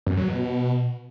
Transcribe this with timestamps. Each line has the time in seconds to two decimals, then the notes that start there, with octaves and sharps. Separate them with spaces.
0.07 F#2
0.17 F#3
0.28 B2